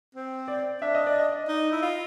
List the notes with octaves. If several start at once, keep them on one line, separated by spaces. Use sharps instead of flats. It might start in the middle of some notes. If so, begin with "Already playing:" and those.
C4
D5
D4 E5
D#5
D5
D#5
D#4
E4
F4